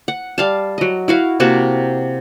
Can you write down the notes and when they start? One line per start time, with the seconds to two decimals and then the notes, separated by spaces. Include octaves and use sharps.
0.08 F#5
0.38 G3 F5 A5
0.78 F#3 D#5
1.08 E4 F#4 F5
1.40 C3 A#3 F#4 A5